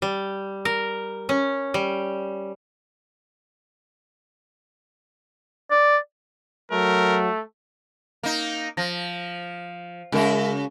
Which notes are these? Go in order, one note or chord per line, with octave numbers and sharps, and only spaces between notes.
G3
A#4
C#4
G3
D5
F#3 A3 A#4
A#3 D#4
F3 A#6
C#3 G#3 F#4 A#4 E5